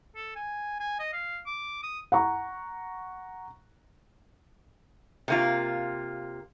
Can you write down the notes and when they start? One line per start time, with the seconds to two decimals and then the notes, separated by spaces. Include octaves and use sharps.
0.16 A4
0.36 G#5
0.80 G#5
0.99 D#5
1.13 F5
1.46 D6
1.83 D#6
2.12 F#5 A#5 C#6
5.28 C3 A#3 F4